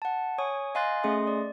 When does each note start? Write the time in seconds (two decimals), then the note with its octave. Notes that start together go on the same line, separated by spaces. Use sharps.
0.02 F#5 A5
0.38 C#5 G#5 C#6 D#6
0.75 D#5 F5 G#5 C6 F#6 A6
1.03 A3 C#4 G#4 D#5 C6 D#6
1.27 D5